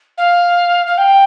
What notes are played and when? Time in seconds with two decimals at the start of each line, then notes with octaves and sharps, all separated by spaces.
0.17 F5
0.87 F5
0.97 G5